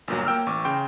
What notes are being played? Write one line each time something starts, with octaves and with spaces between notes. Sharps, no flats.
G1 A#2 F#3
A#3 G5 E6 F6
A1 C#6 D6
C#3 G5 C6